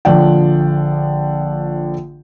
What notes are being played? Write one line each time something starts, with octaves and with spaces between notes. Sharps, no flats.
A#1 D3 F3 D5 G5